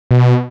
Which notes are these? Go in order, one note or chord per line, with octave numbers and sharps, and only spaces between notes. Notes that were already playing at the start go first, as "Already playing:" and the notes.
B2